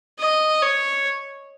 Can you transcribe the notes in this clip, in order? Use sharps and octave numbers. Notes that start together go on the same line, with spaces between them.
D#5
C#5